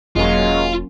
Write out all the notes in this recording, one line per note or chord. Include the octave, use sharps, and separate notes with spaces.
E1 F#3 G#3 A#3 C#4 F4